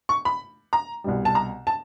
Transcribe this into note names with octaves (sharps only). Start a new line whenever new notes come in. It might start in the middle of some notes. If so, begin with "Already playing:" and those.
C#6
B5
A#5
C2 B2 G3
A5
A#5
A5